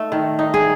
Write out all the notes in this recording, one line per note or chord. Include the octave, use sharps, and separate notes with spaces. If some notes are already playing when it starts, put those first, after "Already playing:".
Already playing: A3 D#4
D#3
D#4
G#4